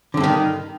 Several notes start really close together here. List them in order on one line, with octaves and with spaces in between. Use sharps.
D3 E2 G2 D#3